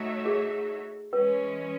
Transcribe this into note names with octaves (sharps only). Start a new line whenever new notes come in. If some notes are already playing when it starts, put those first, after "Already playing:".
Already playing: A3 D#4 F#4 C#5 E5
G#4
E3 G#3 C#4 B4